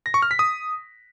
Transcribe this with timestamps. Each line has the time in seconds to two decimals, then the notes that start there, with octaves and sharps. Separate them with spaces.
0.06 A#6
0.14 C#6
0.22 F6
0.31 B6
0.39 D#6